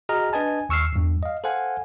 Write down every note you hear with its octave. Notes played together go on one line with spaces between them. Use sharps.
F#4 G#4 D#5 A#5 F6
D4 B4 D#5 G#5 A5
D#2 C#6 E6 F6 C7
E2 G2
D#5 F5
A4 C5 F5 F#5 G#5